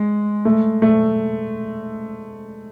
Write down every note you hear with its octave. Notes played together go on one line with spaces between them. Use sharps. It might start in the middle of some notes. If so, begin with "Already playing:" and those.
Already playing: G#3
A3
A3